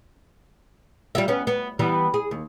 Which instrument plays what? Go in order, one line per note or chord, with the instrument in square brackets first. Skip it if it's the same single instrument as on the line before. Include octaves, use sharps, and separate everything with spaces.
[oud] G3 F4 E5
B3 C#4
B3
E3 G3 B3
G#4
D#2